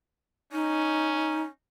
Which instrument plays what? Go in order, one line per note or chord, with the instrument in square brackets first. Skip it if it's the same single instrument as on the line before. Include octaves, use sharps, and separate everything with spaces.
[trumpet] C#4 [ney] D#4